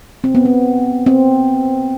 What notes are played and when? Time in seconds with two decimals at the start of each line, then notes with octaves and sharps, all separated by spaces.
0.24 C4
0.35 B3
0.46 C4
1.06 C4